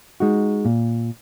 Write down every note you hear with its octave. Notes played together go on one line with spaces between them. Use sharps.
G#3 D#4 F#4
A#2